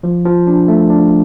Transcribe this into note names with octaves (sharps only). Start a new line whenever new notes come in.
F3
F3
D4
A3
D4